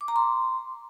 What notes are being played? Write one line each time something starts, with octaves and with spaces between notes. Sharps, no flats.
D6
A#5
C6